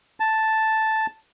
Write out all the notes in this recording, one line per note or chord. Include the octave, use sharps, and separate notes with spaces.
A5